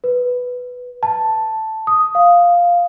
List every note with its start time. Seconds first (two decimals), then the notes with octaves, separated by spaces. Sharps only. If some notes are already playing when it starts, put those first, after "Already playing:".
0.04 B4
1.03 A5
1.87 D#6
2.15 F5